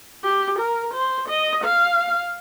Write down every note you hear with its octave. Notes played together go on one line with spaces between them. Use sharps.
G4
A#4
C5
D#5
F5